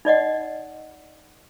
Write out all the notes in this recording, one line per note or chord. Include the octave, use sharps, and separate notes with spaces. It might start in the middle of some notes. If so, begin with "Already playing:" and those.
D#4 D5 D#5 F#5